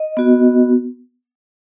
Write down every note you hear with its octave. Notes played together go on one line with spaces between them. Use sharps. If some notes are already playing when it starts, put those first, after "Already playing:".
Already playing: D#5
B3 F#4